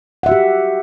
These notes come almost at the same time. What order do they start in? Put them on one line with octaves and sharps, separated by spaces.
F#5 E5 F#4 G4